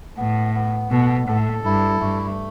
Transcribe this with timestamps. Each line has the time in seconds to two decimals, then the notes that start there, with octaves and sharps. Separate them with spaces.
0.17 A2 B3
0.54 B3
0.90 B2 A4
1.28 A2 A4
1.64 G2 E4
2.01 G2 A3